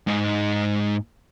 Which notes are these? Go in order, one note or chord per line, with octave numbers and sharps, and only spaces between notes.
G#2 D#4